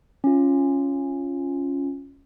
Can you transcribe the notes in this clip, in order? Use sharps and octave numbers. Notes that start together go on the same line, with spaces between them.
C#4 F4